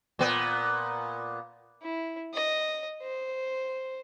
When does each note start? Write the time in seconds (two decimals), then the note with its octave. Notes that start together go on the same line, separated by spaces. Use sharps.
0.19 A#2 B3
1.82 E4
2.34 D#5
3.02 C5